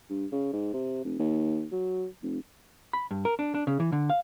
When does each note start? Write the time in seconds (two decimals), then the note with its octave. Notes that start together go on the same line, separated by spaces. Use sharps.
0.10 G2
0.32 C#3
0.53 G#2
0.73 C3
1.04 F1
1.19 D#2
1.72 F#3
2.23 F1
2.93 B5
3.11 G2
3.25 A#4
3.39 D4
3.55 D4
3.67 C#3
3.80 E3
3.92 D3
4.10 F5